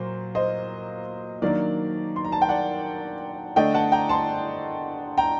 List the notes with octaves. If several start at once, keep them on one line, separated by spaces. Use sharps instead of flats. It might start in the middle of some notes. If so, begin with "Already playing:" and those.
Already playing: A#2 F#3 A#3 C5
C5 D#5
D#3 F#3 A#3 D4 A#4 D5
C6
A#5
A5
G5
D5 F#5
D3 A3 D4 D#5 G5
F#5 A5
G5 A#5
A5 C6
G5 A#5